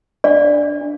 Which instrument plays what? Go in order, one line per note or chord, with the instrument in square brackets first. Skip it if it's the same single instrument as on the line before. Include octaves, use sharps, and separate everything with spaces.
[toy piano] D4 D5 F5
D4
D4